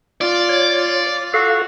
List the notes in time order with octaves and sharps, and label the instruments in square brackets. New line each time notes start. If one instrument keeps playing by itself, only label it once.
[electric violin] F4 [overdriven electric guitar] D5
[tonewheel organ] C#5
[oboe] F#4 [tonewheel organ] A4 F5